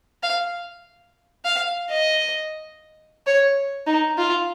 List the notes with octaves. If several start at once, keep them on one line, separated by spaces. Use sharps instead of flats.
F5
F5
D#5
C#5
D#4
F4